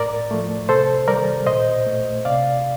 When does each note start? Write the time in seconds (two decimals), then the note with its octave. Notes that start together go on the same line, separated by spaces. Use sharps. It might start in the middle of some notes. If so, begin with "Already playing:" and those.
Already playing: A2 A#4 D5
0.31 F3 A3
0.69 C3 A4 C5
1.08 D#3 G3 A#4 D5
1.47 A#2 C5 D#5
1.86 A3
2.25 C3 D5 F5